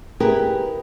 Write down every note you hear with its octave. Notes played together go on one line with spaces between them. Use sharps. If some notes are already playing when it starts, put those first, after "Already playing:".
E4 G4 G#4 A#4 B4